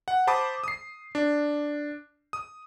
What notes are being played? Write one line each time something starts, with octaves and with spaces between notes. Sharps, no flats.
F#5
C5 A5 B5 D6 D#6
D#6 C7
D4
D#6